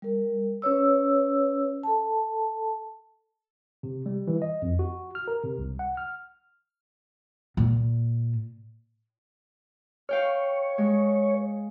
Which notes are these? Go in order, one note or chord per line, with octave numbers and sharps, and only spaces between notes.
G3 A#4
C#4 B4 C#5 E6
A4 A5
C3
G3
E3
D#5
F2
F#4
F6
A#4
C3
C2
F#5
F6
A#2
C#5 F5 G5 F6
G#3